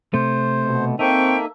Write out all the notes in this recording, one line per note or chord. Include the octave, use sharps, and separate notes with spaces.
C3 A3 C5
B2
A#3 C4 D#4 A4 E5 G5 C#6